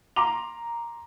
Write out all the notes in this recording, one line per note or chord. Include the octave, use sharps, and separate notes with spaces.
A#5 C6 D6 F7